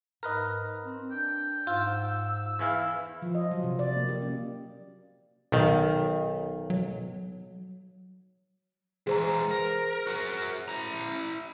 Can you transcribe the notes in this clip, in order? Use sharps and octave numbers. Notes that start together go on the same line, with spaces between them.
G#2 A#4 B4 D#5
C4
D4 G5
G#2 F4 E6
E2 E3 E4 F5
F3
D#5
F#3
C3
D5
A#3
G4
C#4
B1 B2 D#3
F#3
E3 G#3 G#4 C5 A#5
A#4
F#4 A#4
E4 A#5